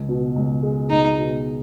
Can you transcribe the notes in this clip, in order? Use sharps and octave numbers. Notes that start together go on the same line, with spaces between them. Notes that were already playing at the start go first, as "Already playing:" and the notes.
Already playing: C#2
B2
C#2
G#3
C#2 D#4
B2